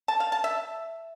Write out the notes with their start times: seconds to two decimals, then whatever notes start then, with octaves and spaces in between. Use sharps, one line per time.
0.08 A5
0.20 F5
0.32 A5
0.44 E5